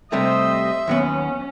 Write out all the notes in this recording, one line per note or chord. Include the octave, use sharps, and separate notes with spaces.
C3 G3 A3 C5 D#5 E5
D#2 F#3 B3 C#4